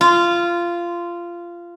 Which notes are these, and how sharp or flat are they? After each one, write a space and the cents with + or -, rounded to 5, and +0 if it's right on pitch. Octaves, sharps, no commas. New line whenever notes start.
F4 -15